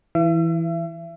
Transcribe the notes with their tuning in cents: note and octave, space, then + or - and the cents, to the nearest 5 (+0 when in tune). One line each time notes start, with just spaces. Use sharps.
E3 +0 E5 +40